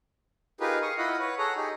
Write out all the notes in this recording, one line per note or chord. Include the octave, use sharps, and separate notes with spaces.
D#4 F4 G4 G#4 A#4 B4
F5 C#6 D#6
E4 F4 D#5 F#5 B5
B4 C#5 F#5
G#4 A4 C#5 F#5 A#5
D#4 G4 G#4